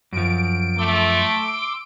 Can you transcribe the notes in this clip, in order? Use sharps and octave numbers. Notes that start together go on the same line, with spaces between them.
F#2 F3 D7
A3 C6 D6 E6